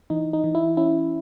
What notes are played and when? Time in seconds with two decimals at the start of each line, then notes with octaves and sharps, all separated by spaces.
0.10 E3 D#4
0.33 D#4
0.44 E3
0.55 E4
0.77 C#4 E4